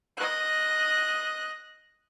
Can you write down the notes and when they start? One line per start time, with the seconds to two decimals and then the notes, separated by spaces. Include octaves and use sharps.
0.17 D#5 F#6